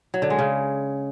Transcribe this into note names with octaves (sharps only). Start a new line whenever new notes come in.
F#3
D3
G#3
C#3